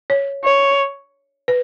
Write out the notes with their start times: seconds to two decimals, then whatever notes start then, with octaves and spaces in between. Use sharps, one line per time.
0.10 C#5
0.44 C#5
1.48 B4